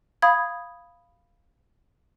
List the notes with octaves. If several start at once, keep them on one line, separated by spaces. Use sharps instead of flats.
F5 B5 D#6 G#6